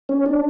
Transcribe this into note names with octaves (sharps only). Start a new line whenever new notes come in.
C#4
D4